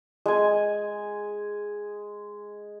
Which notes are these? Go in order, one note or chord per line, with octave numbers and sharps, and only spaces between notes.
G#3 G#5